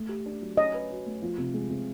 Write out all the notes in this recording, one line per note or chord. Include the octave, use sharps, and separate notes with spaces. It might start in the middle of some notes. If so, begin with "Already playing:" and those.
Already playing: A3
G4
D4
F#3
C#4 D#5
B4
F#4
A3
F3
C3
G#3
C3